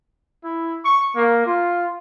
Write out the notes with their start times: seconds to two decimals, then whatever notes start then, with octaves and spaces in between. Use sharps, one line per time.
0.44 E4
0.85 C#6
1.16 A#3
1.46 F4